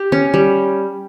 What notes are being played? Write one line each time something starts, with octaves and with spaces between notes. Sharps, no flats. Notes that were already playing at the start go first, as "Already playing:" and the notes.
Already playing: G4
C#4
G3